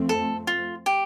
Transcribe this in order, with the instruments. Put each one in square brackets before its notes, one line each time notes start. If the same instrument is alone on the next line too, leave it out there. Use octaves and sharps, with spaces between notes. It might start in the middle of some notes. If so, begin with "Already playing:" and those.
Already playing: [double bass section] F2 F3 A3 C4
[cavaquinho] A4
F4
G4